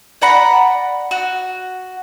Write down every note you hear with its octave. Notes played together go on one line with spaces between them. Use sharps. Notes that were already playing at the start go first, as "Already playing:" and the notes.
D5 F#5 A#5 B5
F#4